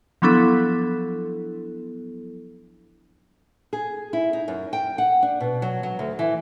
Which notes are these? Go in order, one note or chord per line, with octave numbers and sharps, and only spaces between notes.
F3 F#3 B3 D4 E4 A4
G#4
E4
D#4
F#2
G5
F#5
D4
B2
F#3
F#3
D2
E3